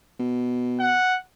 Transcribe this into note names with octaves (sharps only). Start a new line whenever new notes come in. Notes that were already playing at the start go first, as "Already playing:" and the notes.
B2
F#5